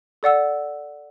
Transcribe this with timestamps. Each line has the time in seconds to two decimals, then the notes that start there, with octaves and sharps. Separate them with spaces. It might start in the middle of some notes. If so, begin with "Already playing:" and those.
0.23 A4 D5 F#5 E6